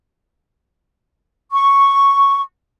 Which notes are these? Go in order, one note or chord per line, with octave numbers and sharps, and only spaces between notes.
C#6